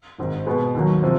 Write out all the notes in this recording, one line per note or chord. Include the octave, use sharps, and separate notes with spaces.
G#1 G#2 D#3
B2 G#3 B3
D#2 D#3 F#3
C3 F3